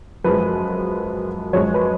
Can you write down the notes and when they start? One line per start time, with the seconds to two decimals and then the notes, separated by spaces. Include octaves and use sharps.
0.24 F#2 F3 G#3 B4
1.53 F#2 F3 G#3 C#5
1.74 B4